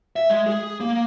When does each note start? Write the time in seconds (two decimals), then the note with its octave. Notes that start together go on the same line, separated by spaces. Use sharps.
0.16 E5
0.30 G#3
0.46 G#4
0.80 A#3